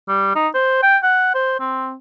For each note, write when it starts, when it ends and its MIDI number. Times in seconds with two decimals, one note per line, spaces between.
0.08 0.34 55
0.35 0.48 63
0.54 0.81 72
0.83 0.97 79
1.03 1.30 78
1.35 1.58 72
1.59 1.95 60